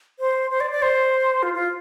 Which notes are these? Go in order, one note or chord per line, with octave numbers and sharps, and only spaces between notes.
C5
C5
D5
D5
C5
F4
F4